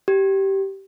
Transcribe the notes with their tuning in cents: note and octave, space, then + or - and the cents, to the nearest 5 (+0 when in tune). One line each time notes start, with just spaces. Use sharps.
G4 -15